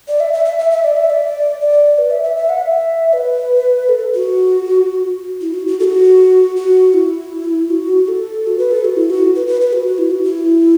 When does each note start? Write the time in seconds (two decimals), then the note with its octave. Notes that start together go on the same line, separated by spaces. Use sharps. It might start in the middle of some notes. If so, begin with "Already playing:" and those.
0.08 D5
0.20 E5
0.33 E5
0.45 E5
0.59 E5
0.71 E5
0.84 D5
0.97 E5
1.10 D5
1.61 D5
1.98 B4
2.10 E5
2.23 E5
2.36 E5
2.50 F#5
2.61 E5
3.13 B4
3.89 A4
4.15 F#4
5.41 E4
5.54 F#4
5.67 F#4
5.80 A4
5.84 F#4
6.56 F#4
6.94 E4
7.70 F#4
8.08 A4
8.47 F#4
8.59 B4
8.71 A4
8.85 F#4
8.97 E4
9.10 F#4
9.36 B4
9.47 B4
9.61 B4
9.73 F#4
9.86 F#4
9.98 E4
10.11 F#4
10.24 E4